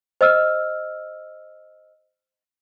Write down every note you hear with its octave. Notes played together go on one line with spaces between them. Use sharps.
C5 D#5 E6 F6